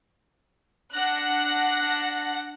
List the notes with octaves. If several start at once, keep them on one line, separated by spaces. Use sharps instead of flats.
D4 F#5 F#6 A#6